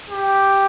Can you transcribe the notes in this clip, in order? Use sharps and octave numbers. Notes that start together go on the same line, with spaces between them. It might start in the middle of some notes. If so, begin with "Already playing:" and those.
G4